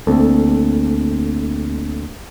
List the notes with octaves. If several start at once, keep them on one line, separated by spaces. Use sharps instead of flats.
D2 A#3 C4 A4